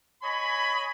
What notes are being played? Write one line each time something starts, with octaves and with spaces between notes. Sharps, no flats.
C#5 D#5 G#5 B5